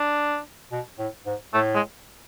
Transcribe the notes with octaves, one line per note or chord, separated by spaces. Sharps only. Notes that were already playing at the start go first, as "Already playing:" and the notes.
Already playing: D4
B2
A2
G#2
A2 A3
G#3